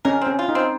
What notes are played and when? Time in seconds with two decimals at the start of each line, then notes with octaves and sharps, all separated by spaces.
0.05 C#4 A#4
0.22 C4
0.27 C#4
0.39 F4
0.49 D#4
0.55 C4